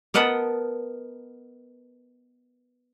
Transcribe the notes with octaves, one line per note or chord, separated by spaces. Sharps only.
B3 A#4 D#5 F#5 A5 B5